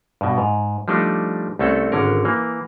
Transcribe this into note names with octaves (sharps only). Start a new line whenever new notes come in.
G2 B2
G#2
F3 G3 A3 D4 D#4
C2 A3 C4 C#4 A4
G#1 D3 C#4 A#4
E3 A#3